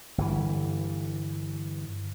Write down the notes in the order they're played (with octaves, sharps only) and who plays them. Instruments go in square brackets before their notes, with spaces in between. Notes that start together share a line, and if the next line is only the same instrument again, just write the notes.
[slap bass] G1 E3